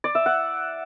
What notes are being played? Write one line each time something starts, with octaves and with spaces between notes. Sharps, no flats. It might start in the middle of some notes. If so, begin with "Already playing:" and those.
D5
E5
F#5